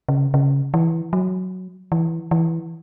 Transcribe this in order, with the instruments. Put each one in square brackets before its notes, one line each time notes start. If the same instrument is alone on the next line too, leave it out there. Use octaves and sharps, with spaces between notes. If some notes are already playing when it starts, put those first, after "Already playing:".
[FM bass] C#3
C#3
E3
F#3
E3
E3